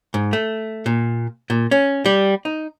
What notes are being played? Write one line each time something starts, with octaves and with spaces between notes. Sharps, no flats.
G#2
A3
A#2
A#2
C#4
G3
D#4